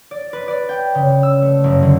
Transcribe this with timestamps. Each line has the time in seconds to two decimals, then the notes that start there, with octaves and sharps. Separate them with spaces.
0.11 D5
0.33 B4
0.48 D5
0.69 G5
0.95 C#3
1.23 E6
1.42 A3
1.64 F#1
1.83 D3